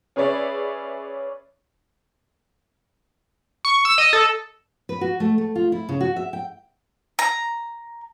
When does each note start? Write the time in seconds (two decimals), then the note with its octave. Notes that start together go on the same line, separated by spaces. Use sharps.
0.16 C#4 G#4 B4 C#5 D5 E5
3.65 C#6
3.85 E6
3.98 D#5
4.13 A4
4.89 B4
5.01 F#4
5.20 A3
5.38 A3
5.55 F4
5.72 E4
5.89 C#3
6.01 F#4
6.16 E5
6.33 G5
7.19 A#5